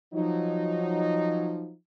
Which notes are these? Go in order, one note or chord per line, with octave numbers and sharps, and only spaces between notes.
F3 F#3 D#4